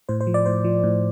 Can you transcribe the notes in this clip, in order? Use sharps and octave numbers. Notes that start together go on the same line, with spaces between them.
A2 C5
C5
F3
D5
A2 C5
F3
A2